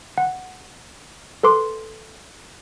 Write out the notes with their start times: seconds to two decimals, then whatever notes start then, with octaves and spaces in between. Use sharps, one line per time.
0.18 F#5
1.43 A4 B4 C6 D6